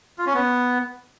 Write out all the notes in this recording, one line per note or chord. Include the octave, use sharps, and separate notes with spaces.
F4
C#4
B3